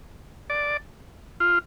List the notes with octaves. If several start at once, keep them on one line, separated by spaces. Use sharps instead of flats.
D5
F4